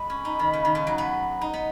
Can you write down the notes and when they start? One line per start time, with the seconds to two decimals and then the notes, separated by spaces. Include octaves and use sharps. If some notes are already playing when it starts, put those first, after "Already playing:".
Already playing: G#3 B5
0.10 C#4
0.25 D#4
0.39 D#3
0.53 C#3
0.65 D#3
0.75 C#3
0.87 F#3
0.97 B3 B5
1.41 D#4
1.53 B3